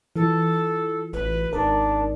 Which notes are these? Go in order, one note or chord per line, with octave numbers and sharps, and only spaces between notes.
E3 F4 A4
A1 B4
G#1 D4 D#4 A#4 D5